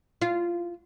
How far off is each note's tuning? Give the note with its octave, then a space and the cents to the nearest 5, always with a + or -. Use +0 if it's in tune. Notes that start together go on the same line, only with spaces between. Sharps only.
F4 -15